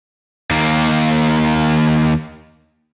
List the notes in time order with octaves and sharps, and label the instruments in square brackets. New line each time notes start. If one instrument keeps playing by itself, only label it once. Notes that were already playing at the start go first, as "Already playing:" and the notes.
[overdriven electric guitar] D#2 A#3